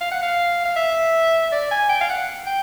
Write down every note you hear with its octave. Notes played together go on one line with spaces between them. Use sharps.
F5
F#5
F5
F5
E5
D5
G#5
G5
F5
F#5
G5